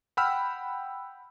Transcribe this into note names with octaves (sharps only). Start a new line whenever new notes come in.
F#5 G5 B5 E6 F6